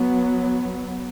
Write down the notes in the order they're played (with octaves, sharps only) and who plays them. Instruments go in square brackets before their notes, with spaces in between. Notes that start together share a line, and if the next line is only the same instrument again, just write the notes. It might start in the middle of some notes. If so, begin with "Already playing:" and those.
Already playing: [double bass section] F#3 B3